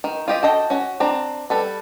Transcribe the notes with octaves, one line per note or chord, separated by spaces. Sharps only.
D#3
F4 G4 D#5
F#4 A4 D#5 G5
C#4 F#4
C4 D4 A#5
G3 A4 B4